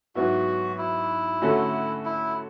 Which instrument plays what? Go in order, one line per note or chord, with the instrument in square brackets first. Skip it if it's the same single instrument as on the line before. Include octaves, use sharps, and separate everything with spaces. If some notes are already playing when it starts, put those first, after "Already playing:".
[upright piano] G#2 F#3 B3 E4 [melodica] F#4
[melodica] E4
[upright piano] D3 A3 C#4 F#4 A4
[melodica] E4